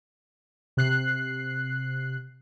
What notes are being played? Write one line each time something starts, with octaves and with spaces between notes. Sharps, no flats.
C3 F#6 C7